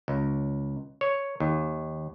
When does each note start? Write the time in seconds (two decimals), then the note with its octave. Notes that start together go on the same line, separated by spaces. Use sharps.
0.08 C#2
1.01 C#5
1.40 D#2